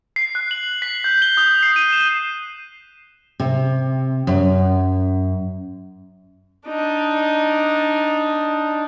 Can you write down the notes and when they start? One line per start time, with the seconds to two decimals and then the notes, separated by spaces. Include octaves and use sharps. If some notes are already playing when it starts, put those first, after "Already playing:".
0.16 C7
0.35 F#6
0.51 F#7
0.82 B6
1.04 G6
1.22 G7
1.37 D#6
1.63 C7
1.76 D#7
1.93 E7
3.40 C3
4.27 F#2
6.68 D4 D#4